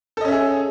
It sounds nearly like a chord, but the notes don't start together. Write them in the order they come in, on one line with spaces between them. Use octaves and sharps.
A4 D#5 C#4 E5 G#4